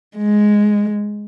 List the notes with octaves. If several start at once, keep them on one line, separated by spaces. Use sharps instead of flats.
G#3